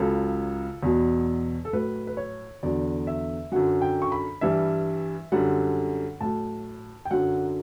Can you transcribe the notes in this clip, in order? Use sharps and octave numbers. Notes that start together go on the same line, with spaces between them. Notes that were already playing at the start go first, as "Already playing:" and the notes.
Already playing: C#2 C#3 F#3 A4
E2 B2 F#3
A4
A2 F#3 B4
B4
C#5
E2 D3 F#3 D5
E5
F#2 D3 F#3 F#5
G5
C#6
B5
G2 E3 G3 E5
F#2 D3 G3 F#5
A2 F#3 A5
G5
F#2 D3 F#3 F#5